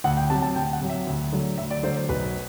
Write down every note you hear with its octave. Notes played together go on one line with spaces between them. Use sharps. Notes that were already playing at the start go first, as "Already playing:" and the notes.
D2 F#5
G5
C3 F#3 A5
A5
D2 G5
F#5
C3 F#3
E5
D2
D3 F#3 A3
D2 E5
D5
D3 F#3 A3 C5
C5
B1 B4